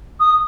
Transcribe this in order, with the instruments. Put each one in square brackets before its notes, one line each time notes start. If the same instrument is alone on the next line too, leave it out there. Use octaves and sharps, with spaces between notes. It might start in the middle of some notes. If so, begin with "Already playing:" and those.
[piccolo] D#6